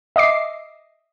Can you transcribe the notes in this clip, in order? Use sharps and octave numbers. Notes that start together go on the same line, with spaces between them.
D#5 E5 D6 C7